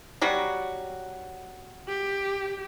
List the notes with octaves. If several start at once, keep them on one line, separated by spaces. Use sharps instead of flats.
F#3 G3 F#4
G4